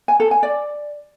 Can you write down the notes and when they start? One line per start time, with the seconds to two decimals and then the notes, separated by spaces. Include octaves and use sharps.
0.08 G#5
0.20 A4
0.31 G#5
0.43 D5